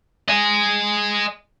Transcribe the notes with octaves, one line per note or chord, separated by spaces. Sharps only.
D#5 G#5